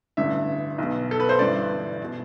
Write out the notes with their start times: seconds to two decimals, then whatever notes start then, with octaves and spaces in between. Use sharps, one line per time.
0.17 A1 G2 D3 E5
0.78 B1 B2
1.11 A4
1.20 B4
1.29 C5
1.39 G1 G2 E3 D5
2.04 B2